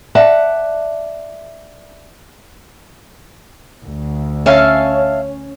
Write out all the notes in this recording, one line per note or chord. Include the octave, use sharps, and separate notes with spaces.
D5 E5 F#5 A5
D2
C#4 E5 F5 A5